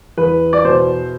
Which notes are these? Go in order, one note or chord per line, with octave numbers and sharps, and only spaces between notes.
E2 B4
D5
B2 C5